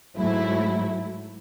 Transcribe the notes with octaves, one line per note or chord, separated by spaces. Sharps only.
G#2 F#3 A3 E4